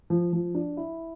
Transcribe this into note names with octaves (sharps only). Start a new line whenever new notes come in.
F3
F3
D4
E4